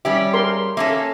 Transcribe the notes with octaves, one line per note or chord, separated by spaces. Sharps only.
G3 C#4 G4 E5
G#4 A#4 C6
A#3 C#4 A4 E5